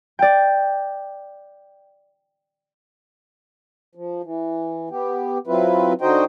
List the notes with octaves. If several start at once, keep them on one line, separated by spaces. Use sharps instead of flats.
D5 G5
F3
E3
B3 G4
F#3 C4 E4 F4 B4
D3 D#4 F#4 C5 D#5 G5